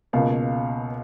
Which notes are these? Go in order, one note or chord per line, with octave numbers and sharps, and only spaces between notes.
C#2 B2 A#3 F5